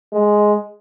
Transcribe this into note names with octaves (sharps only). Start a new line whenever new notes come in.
G#3